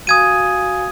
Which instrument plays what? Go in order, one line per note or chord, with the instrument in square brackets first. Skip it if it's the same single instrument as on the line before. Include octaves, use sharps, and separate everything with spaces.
[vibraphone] F#4 F5 G#5 [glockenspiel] D#6 G#6 D#7